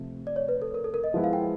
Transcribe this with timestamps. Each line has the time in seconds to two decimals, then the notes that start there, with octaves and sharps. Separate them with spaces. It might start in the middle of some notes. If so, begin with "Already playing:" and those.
Already playing: C3 F3 A3
0.27 D5
0.36 C#5
0.48 B4
0.62 A4
0.74 A#4
0.84 A4
0.94 A#4
1.04 D#5
1.14 F3 G#3 B3 E4 E5
1.24 F5
1.33 G5